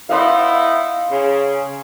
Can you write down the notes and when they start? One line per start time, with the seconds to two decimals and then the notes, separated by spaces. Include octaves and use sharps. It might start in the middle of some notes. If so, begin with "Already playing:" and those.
0.09 B3 D#4 E4 F5 C6
1.11 C#3